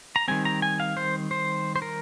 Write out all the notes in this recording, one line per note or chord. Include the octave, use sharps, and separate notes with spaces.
A#5
D#3 G3 C4 G#5
A#5
G#5
F5
C5
C5
C5
A#4